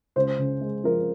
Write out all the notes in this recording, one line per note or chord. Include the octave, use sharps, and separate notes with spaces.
C#2 C5
C#3
G#3
F3 A#4